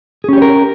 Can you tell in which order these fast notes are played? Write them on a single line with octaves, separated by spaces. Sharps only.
G#4 C#4 G4 C#5 A#4